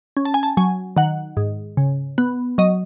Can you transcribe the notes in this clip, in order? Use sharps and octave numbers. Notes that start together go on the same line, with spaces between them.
C#4
A5
G#5
A5
F#3 G#5
D#3 F#5
G#2
C#3
B3
F#3 D#5